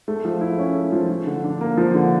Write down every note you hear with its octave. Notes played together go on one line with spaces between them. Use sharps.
A3
F3
E4
C#4
A3
F3
F3
D3
D4
A#3
F3
D3